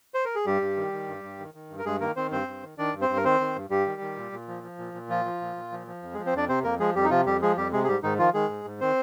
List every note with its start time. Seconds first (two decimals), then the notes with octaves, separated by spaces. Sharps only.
0.14 C5
0.25 A#4
0.35 G#4
0.46 G2 G3 G4
0.61 G2
0.77 D#3
0.93 D#3
1.08 G2
1.24 G2
1.39 D#3
1.54 D#3
1.70 G2
1.79 A#4
1.85 G2 G#3 G#4
2.00 D#3 A#3 A#4
2.16 D#3 C4 C5
2.31 G2 C4 C5
2.48 G2
2.63 D#3
2.78 D#3 D4 D5
2.94 G2
3.01 C4 C5
3.09 G2
3.17 A#4
3.24 D#3 C4 C5
3.40 D#3
3.55 G2
3.70 G2 G3 G4
3.86 D#3
4.01 D#3
4.17 A#2
4.32 A#2
4.48 F3
4.63 F3
4.78 A#2
4.94 A#2
5.09 F3 F4
5.25 F3
5.41 A#2
5.56 A#2
5.72 F3
5.87 F3
6.03 F2
6.14 G#3 G#4
6.18 F3
6.26 C4 C5
6.33 F2 D4 D5
6.49 C3 C4 C5
6.64 F2 A#3 A#4
6.79 F3 G#3 G#4
6.95 F2 G3 G4
7.05 D#4
7.10 C3 F3 F4
7.26 F2 G3 G4
7.42 F3 G#3 G#4
7.57 F2 G3 G4
7.72 C3 G#3 G#4
7.84 G#4
7.88 G#2 G3 G4
8.03 G#2 D#3 D#4
8.19 D#3 F3 F4
8.34 D#3 G#3 G#4
8.49 G#2
8.65 G#2
8.80 D#3 C4 C5